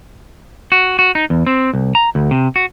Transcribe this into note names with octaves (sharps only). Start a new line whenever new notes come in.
F#4
F#4
D#4
E2
C4
C2
A#5
D2
C3
F#4